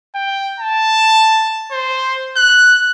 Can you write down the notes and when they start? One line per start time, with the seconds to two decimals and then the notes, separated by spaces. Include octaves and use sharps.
0.15 G5
0.60 A5
1.72 C5
2.37 F#6